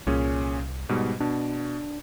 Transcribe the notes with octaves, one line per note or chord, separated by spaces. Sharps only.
C2 A#2 C#4 G#4
G#2 B2 G3
B2 D4